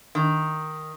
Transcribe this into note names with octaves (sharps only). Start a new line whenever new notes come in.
D#3